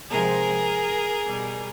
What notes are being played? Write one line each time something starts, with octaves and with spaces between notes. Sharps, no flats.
C3 F3 G#3 G#4 A#4
B2 G3